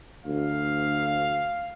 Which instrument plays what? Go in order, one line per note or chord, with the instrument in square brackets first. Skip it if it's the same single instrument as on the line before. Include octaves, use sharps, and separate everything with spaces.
[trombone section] D2 [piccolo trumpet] F5